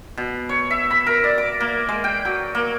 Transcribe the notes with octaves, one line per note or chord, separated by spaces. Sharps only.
B2
C#5
E5
B5
A#4
D5
D6
A#3
G#3
G5
F#3
A#3